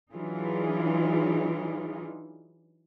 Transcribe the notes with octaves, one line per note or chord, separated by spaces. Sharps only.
E3 F#3 D4 D#4 F4 G#4